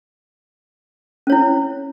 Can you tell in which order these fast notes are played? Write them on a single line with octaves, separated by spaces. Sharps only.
C#4 C#5 E4